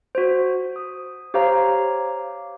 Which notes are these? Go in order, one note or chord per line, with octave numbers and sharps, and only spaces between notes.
F#4 C5
D#6
G4 C5 C#5 F5 A#5